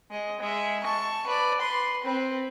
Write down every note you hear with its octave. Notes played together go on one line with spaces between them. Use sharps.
G#3 D#5
G#3 E5
A5 C#6
B4 D5
B4 C6
C4 B4